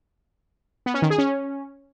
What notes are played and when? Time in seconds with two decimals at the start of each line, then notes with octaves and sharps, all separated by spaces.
0.86 B3
0.94 C#4
1.02 D#3
1.10 G#4
1.18 C#4